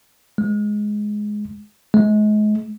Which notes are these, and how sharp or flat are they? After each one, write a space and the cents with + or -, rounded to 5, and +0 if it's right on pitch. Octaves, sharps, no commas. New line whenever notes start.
G#3 +10
G#3 +35